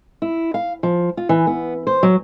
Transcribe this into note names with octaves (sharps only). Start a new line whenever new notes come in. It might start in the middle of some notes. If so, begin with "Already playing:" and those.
E4
F5
F3
F4
E3
B3
C5
F#3